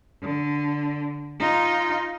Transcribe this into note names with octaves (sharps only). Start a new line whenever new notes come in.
D3
D#4 F4